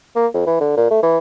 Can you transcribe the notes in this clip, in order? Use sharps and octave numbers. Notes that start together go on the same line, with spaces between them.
A#3
F2
E3
D3
A#2
A3
E3